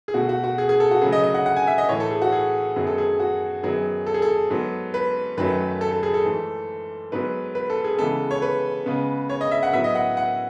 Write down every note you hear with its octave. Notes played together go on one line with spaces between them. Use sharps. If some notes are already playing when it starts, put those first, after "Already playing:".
G#4
B2 A3 F#4
F#4
F#4
G#4
G#4
A4
F#4
C#3 F#3 A3 G#4
D#5
D#5
F#5
F#5
G#5
E5
D#5
A2 E3 A3 C#5
A4
G#4
F#4
G#4
F#2 D#3 F#3 B3 G#4
A4
G#4
F#4
F#2 D#3 F#3 B3 G#4
A4
G#4
A4
G#2 F#3 B3
B4
F#2 D#3 F#3 A3 B4
A4
A4
G#4
A4
G#2 E3 A3
G#2 F#3 B3 B4
B4
A4
G#4
C#3 E3 G#3 B3 A4
C#5
B4
C#3 G#3 B3
C#5
D#5
E5
F#5
A2 F#3 B3 E5
D#5
F#5
F#5